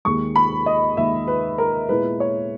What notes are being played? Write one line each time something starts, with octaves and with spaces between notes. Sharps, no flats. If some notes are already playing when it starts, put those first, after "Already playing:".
D#2 D#3 G#3 C#6
B5
D#5
D#2 D#3 G#3 E5
B4
A#4
A#2 G#3 B3 E4 B4
C#5